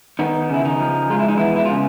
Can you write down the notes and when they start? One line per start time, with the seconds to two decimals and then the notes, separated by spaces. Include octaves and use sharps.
0.19 D#3 B3 D#4
0.50 C#3 E4
0.65 D#3 D#4
0.80 F3
1.10 G#3 F4
1.19 E4
1.28 D#4
1.37 E3 B3 E4
1.56 E4
1.65 F4
1.71 C#3